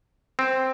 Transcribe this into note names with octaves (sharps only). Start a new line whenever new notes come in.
C4